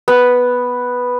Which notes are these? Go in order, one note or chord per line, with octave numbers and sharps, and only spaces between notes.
B3